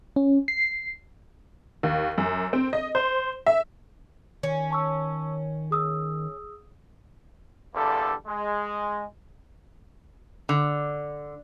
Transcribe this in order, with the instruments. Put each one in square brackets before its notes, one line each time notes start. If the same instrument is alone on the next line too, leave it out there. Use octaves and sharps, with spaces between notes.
[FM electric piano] C#4
C7
[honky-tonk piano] D#2
F#2
C4
D#5
C5
E5
[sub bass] D#3 [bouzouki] C#4
[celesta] A5 C#6 E6
G#4 D#6 E6
[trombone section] E2 D3 G3 A#3 A4
G#3
[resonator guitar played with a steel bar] D3